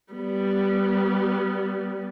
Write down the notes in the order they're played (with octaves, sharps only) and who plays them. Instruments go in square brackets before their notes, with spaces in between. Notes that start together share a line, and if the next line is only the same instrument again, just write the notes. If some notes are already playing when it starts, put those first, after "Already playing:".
[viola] G3 B3